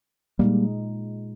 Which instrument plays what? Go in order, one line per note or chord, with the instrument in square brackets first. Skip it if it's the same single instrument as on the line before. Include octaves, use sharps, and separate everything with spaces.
[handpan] A#2 G#3 D#4 [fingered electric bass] G3 A#3